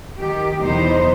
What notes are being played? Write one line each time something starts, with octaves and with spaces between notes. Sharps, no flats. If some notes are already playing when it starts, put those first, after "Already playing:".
D#3 G4
E2 B2 F#3 B3 D#4 C5